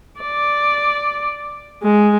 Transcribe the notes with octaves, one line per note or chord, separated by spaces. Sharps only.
D5
G#3